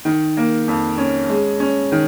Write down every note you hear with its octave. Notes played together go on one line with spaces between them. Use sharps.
D#3
A#3
F2
C#4
G#3
C#4
D#3